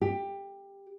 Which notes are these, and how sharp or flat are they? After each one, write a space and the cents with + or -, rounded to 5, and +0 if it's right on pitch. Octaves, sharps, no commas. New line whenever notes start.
G4 +15